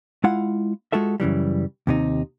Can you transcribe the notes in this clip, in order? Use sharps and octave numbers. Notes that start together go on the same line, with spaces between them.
G#3 E4 F4 F5 F#5
G#3 F4 F#4 A4 E5
F#2 C#3 E3 G3
D#2 C3 D#4